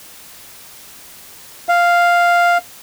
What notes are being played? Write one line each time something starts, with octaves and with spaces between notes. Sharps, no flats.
F5